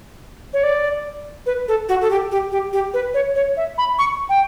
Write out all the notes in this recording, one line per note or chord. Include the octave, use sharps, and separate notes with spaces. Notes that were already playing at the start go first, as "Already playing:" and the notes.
C#5
D5
B4
A4
F#4
A4
G4
G4
G4
G4
B4
C#5
C#5
E5
B5
C#6
G5